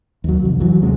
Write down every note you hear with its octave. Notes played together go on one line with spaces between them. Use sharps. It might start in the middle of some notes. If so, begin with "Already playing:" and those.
D#2 F#3
C2 F2
E3 F#3
D#2 C3 G#3